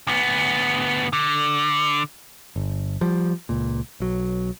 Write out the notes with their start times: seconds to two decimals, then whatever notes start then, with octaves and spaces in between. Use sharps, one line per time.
0.07 D2 B3
1.13 D3
2.56 G1
3.01 F3 G3
3.49 C#2 A#2
4.00 B1 F#3